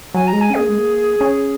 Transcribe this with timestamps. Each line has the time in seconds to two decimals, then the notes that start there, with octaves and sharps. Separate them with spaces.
0.14 F#3 G#5
0.27 A#5
0.33 G#3
0.41 G#5
0.50 C#4
0.55 A#3 G#4
0.69 G#3
0.78 A#3
1.21 C#4